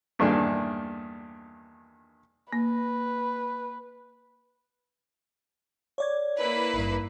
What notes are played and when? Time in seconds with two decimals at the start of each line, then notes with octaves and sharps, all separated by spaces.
0.19 E2 G2 A#2 D#3 A3 D4
2.53 A#3 B4
5.98 C#5 D5 G#6
6.38 A#3 E4 B4
6.74 G#1 G2